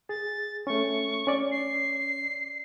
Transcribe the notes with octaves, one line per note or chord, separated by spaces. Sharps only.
G#4 A6
A3 C#4 C#6
C#4 D5
C7